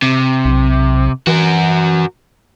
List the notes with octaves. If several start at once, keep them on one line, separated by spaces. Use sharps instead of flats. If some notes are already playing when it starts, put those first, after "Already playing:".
C3
B1
E3 F#4 A#4